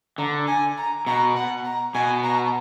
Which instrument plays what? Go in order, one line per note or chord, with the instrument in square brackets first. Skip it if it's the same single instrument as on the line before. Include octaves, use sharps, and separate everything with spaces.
[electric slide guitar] D3 [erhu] A#5
[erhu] G#5
A#5
[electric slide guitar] B2 [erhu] A#5
[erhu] F#5
A#5
[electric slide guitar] B2 [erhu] G#5
[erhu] A#5